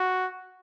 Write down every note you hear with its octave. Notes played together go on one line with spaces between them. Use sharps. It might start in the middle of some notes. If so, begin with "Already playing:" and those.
Already playing: F#4